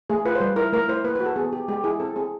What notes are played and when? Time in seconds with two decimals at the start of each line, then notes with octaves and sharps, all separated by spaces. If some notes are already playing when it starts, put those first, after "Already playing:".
0.10 A3 G#4
0.25 F4 B4
0.35 C5
0.40 G3 B4
0.56 E4 A#4
0.73 A3 A#4
0.89 E4 C5
1.04 A#3 B4
1.16 F#4 B4
1.26 A4
1.36 B3 G#4
1.53 G4
1.68 G#3 G4
1.84 E4 G#4
2.00 C4 A4
2.16 C4 G#4